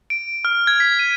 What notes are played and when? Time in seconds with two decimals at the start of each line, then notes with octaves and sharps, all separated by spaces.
0.10 D7
0.45 F6
0.67 G#6
0.80 B6
0.99 D#7